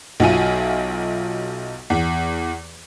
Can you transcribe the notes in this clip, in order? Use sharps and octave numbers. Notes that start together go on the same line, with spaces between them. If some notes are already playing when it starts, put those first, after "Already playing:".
B1 F#3 F4 E5 G#5 D#7
E2